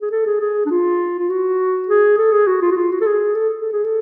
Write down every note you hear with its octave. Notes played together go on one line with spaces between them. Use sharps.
G#4
A4
G#4
G#4
D4
F4
F4
F#4
G#4
A4
G#4
F#4
F4
F#4
F4
F#4
A4
G#4
A4
A4
G#4
A4